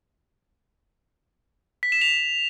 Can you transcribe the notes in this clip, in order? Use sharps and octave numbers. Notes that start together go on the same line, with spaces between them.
B6
E7
F7